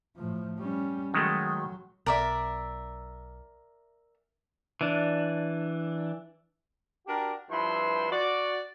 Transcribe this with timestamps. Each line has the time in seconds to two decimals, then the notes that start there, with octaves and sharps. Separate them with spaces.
0.17 A2 F3
0.59 G3 C#4
1.14 D#3 F#3 G#3 A3
2.06 B1 A#4 D5 E5
4.81 E3 D4
7.08 D4 F#4 G4 A#4
7.50 G2 F3 E4 B4 E5 C6
8.11 F#4 D5